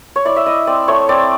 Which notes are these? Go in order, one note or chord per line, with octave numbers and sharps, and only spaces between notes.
C#5
E4 D5
E5
E4 D#5
C4 D5
A3 C#5
C4 D5